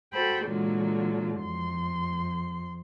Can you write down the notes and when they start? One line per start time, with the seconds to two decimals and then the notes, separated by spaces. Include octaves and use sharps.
0.13 F#4 A4 C5 G5 B5
0.45 A#2 D3 E3 F#3 G#3 F4
1.41 F2 C6